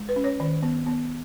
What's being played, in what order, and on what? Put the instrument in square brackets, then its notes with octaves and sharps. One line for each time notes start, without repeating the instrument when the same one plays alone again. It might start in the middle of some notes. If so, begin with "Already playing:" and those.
Already playing: [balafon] G#3
B4
C#4
C#5
D#3 D5
B3
B3